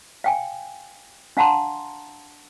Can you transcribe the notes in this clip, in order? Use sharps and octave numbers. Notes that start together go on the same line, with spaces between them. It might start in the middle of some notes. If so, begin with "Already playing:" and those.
F5 G5 G#5
D4 F5 F#5 A5 A#5 C6